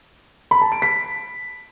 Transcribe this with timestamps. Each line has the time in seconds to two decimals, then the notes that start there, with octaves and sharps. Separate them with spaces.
0.51 B5
0.61 A5
0.72 D7
0.82 B6